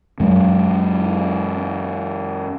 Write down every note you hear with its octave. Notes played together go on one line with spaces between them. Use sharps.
F#2 F#3 G#3